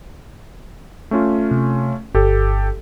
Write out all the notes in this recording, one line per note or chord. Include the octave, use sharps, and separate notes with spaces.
A3 C#4 F4
C3
G1 G4 A4